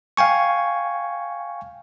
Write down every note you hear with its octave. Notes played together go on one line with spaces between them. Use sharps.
F5 G5 G#5 C#6